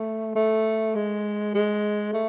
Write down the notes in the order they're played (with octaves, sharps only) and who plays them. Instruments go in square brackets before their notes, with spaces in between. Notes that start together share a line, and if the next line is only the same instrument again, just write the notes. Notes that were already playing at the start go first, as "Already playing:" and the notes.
Already playing: [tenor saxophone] A3
A3
G#3
G#3
A3